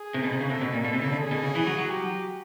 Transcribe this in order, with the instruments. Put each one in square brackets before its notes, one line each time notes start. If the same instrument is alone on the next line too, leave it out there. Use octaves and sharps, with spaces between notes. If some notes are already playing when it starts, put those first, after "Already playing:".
Already playing: [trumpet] G#4
[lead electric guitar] C3
B2
C3
C#3
[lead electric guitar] C3 [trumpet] A4
[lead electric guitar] B2
A#2
B2
C3
C#3
D3
[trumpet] G#4
[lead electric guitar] B2
C#3
E3
F#3
F#3
[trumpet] G4